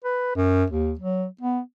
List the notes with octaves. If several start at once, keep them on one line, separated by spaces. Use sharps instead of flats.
B4
F#2
D#2
F#3
B3